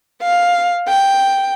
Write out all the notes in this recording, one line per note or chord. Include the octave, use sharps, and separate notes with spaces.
F5
G5